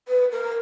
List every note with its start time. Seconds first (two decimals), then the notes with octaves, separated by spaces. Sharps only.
0.08 B4
0.32 A#4